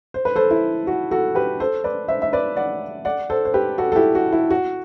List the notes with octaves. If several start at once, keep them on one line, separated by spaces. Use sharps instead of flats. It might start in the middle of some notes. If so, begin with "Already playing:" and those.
C5
B4
A4 C5
E4
F#4
F#4 A4
G4 B4
A4 C5
B4 D5
C5 E5
E5
B4 D5
D5 F#5
D5 F#5
A4 C5
C5
G4 B4
F#4 A4
A4
E4 G4
F#4
E4
F#4